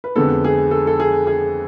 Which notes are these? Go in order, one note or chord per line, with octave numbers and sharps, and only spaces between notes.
B4
F2 D3 G#3 B3 A4
G#4
A4
A4
G#4
G#4